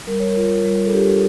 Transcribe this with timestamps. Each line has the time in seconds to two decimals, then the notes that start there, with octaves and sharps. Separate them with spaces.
0.07 G3 A#4
0.20 C#5
0.32 F4 A#4
0.64 G3
0.86 A4
0.92 D4 G4